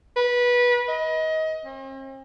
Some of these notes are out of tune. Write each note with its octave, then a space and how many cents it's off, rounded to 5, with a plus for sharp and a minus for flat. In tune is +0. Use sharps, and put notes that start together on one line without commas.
B4 -20
D#5 +25
C4 +45